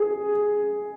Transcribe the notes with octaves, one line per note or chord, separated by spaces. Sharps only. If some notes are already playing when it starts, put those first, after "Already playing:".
Already playing: G#4